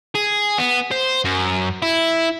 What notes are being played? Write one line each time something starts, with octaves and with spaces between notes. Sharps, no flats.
G#4
B3
C5
F#2
E4